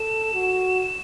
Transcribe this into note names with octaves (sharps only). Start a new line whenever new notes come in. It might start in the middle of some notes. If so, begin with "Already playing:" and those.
Already playing: A4 E7
F#4